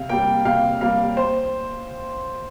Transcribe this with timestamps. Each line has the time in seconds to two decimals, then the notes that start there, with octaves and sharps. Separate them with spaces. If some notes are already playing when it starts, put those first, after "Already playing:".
Already playing: C3 F5
0.09 G3 A#3 G5
0.45 C3 F5
0.81 G3 A#3 F5
1.17 C5